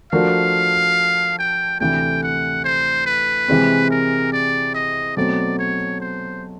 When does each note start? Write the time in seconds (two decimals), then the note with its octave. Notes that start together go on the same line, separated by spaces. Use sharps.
0.12 F3 A3 D4 F#4 A#4 F5
1.39 G5
1.80 D2 C3 E3 A3 G5
2.23 F#5
2.64 C5
3.06 B4
3.48 C3 E3 G#3 C4
3.91 A#4
4.32 D5
4.74 D#5
5.17 B2 F#3 A3 C4 D5
5.59 C#5
6.01 C5